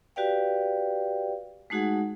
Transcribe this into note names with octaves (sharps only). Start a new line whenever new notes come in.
F#4 G4 B4 D5 F5 G5
G#3 A3 D#4 F#4 G#4 F#5